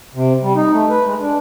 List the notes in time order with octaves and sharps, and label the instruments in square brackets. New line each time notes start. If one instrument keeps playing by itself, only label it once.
[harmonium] C3
G3
D#4
A3
B4
G#3
D4